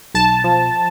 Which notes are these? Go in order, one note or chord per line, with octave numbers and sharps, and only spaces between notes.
B1 A5
F3